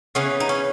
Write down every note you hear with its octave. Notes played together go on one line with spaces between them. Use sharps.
C#3 E3 B3 C#4
D#4
C#4